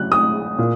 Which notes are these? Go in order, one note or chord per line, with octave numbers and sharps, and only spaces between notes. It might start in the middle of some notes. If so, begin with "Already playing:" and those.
Already playing: C#3 F#3 F#6
D#6
A#2